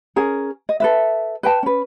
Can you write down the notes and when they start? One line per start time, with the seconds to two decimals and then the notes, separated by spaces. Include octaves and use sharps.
0.16 C#4 G#4 A#4
0.69 D#5
0.80 A4 B4 E5
1.43 B4 G5 A5
1.63 C#4 B4